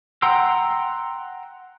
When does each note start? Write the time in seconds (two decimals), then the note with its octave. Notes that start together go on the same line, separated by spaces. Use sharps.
0.22 F#5 G5 A#5 C6 E6